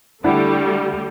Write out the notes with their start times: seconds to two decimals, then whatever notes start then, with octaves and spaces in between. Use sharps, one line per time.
0.24 D3 G3 A3 D4 E4 F#5